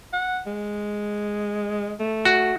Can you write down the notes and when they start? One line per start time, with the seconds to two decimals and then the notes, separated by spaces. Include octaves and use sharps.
0.13 F#5
0.47 G#3
2.00 A3
2.25 F#4